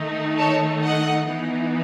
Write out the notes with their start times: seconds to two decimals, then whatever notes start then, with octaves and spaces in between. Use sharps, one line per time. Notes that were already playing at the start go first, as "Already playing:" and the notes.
Already playing: D#3 A3 D#4
0.38 A4 C#5
0.83 D#5 F#5
1.30 E3 B3 D#4